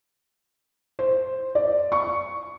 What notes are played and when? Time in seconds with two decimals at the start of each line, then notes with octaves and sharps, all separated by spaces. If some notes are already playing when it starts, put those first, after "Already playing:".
0.99 C5
1.55 D5
1.92 C#6